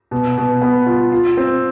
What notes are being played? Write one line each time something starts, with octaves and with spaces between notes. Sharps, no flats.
B2
B2
B3
F4
F4
C4